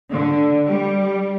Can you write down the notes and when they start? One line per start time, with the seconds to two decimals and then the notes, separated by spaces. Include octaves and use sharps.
0.11 D3
0.67 G3